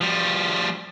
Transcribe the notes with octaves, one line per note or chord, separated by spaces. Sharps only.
F3 G3